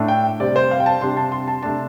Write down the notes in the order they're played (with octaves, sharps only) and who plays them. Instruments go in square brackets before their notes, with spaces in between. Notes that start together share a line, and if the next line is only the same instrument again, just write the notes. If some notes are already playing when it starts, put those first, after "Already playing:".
Already playing: [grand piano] A2 A3 D4
G5
C3 G3 C4 D5
C5
F5
G5
A5
C3 G3 D4 C6
A5
C6
A5
C3 A3 D4 A5